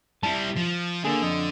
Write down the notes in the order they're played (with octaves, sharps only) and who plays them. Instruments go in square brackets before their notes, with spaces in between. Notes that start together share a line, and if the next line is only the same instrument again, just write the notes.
[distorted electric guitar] G3 E4 [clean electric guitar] A5
[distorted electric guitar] F3
[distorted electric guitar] D3 [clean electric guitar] A#3 G#4
[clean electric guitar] F2 D#5